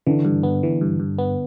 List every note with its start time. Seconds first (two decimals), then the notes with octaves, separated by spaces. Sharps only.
0.07 D3 E3
0.25 G2
0.43 B3
0.63 E3
0.81 G2
1.00 G2
1.18 B3